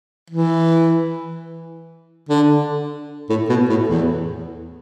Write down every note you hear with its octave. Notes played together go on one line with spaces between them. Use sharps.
E3
D3
A2
B2
A2
E2